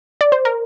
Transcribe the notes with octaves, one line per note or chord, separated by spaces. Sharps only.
D5
C5
A#4